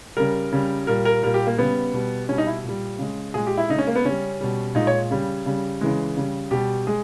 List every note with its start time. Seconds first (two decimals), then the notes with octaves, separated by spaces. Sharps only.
0.17 C#3 G3 A#4
0.52 C#3 G3
0.87 A#2 G3 A#4
1.05 A#4
1.23 A#2 G3 A#4
1.34 G4
1.47 A#3
1.58 C#3 G3 B3
1.93 B2 G3
2.29 B2 G3 C#4
2.38 D#4
2.47 E4
2.64 A#2
2.69 G3
2.99 C#3 G#3
3.34 A#2 G#3 G#4
3.47 G4
3.57 E4
3.69 C#3 D#4
3.74 G#3 C#4
3.87 A#3
3.96 B3
4.04 C#3 G3 C#4
4.41 B2 G3
4.75 A#2 G#3 D#4
4.87 C#5
5.11 C#3 G3
5.46 C#3 G3
5.81 C#3 E3 G#3
6.17 C#3 G3
6.51 B2 G3 G4
6.87 G#3 G#4